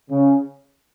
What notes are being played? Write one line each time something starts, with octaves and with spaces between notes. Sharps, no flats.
C#3